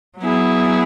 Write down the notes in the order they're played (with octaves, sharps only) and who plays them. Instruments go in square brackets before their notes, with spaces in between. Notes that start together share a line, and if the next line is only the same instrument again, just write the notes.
[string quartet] F#3 B3 E4 G#4